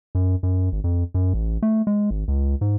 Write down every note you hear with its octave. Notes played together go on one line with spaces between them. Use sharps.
F#2
F#2
G#1
F2
F#2
A1
A3
G#3
G#1
C#2
G#2